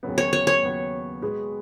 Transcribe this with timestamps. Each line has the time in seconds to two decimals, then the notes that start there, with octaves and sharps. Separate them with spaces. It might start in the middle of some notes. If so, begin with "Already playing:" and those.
0.03 D#2 C#3 F#3 B3
0.18 C#5
0.33 C#5
0.47 C#5
0.63 D#2 C#3 F#3 B3
1.22 B2 G#3 B3 G#4 B4